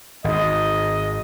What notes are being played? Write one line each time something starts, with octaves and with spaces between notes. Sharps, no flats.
G#1 G#2 D#5